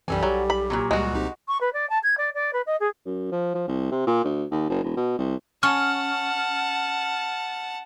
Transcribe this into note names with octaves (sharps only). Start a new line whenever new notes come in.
B1 F#2 E3 G3 A4 G#5
B1 F#3 G4
B5
A#2 C#3 F#3
C#2 G3 G#3 F#4
C2 C4 D#4 G4
C#6
B4
D5
A5
G#6
D5
D5
B4
D#5
G#4
F#2
F3
F3
C2
C3
A#2
D2
D#2
F#1
E1
B2
C2
C#4 F#5 A5 F6